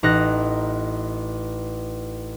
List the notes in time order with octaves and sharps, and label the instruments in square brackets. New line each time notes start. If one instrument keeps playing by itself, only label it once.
[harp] A1 D#4 F#6 A#6